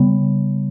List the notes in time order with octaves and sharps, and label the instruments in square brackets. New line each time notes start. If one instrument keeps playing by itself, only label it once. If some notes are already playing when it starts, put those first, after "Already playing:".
Already playing: [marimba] C#3 G3 B3